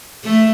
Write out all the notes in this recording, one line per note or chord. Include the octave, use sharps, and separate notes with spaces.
A3